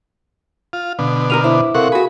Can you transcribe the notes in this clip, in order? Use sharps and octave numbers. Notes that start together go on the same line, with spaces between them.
F4
B2 D3
A#3 G4 A#4 F6 D#7 F7
E4 C5 D6
C3 A4 A#4 F5 F#5 C#6
F#4 G#4 B5